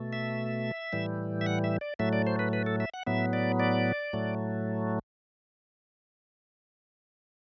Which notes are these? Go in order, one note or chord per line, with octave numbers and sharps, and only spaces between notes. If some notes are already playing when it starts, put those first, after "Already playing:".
Already playing: B2 A3
E5
A2 E3 G3
E5
F#5
E5
D5
A2 F#3 A3 E5
D5
C5
B4
B4
A4
E5
F#5
A2 F#3 B3 E5
D5
D5
A2 F#3 A3